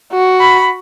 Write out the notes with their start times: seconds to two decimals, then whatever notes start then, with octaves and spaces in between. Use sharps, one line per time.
0.12 F#4
0.40 B5